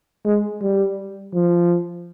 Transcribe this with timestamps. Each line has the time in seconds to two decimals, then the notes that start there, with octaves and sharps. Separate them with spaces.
0.25 G#3
0.62 G3
1.34 F3